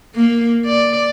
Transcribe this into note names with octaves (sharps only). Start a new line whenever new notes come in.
A#3
D5